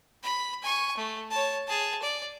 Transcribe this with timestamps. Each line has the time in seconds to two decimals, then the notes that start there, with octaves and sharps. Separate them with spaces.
0.23 B5
0.62 G#5 C#6
0.97 A3
1.30 C#5 A5
1.67 G#4 A5
2.02 D5